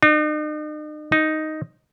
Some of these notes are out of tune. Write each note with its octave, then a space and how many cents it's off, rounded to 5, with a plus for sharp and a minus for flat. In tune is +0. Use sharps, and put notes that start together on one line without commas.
D#4 -45
D#4 +0